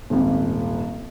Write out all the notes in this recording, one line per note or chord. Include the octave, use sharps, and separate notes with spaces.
D#1 G#1